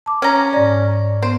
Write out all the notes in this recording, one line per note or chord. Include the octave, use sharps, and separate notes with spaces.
A5 D6
C#4 A#5
G#2 D5
B3 C5